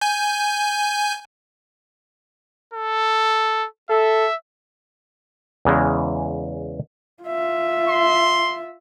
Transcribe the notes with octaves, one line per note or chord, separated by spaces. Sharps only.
G#5 G6
A4
A4 E5
E2 C#3 E3 G#3
F4 E5
C6